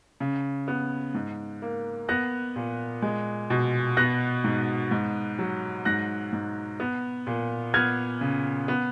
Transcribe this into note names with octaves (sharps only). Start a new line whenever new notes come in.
C#3
B3
G#2
A#3
B3 F#6 A#6
A#2
G#3
B2
B3 F#6 A#6
G#2
G#2
F#3
G#2 F#6 A#6
G#2
B3
A#2
B3 F6 G#6
C#3
B3